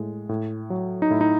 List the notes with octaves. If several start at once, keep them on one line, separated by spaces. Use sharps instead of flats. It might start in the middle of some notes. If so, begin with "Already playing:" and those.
Already playing: A2 G#3
A2
F#3
D#4
A2 E4
D#4